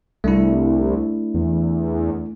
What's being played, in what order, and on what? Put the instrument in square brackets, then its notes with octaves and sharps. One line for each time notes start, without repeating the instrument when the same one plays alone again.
[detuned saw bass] C2 [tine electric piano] A3 D4 E4
[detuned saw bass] E2